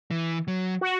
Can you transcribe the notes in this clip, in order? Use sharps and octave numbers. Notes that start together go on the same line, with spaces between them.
E3
F#3
F#4